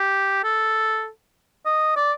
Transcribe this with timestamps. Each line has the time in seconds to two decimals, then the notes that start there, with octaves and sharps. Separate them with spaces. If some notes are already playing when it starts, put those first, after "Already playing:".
Already playing: G4
0.44 A4
1.66 D#5
1.96 D5